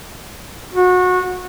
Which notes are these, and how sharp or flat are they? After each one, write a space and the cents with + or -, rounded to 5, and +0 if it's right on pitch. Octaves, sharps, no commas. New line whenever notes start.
F#4 -25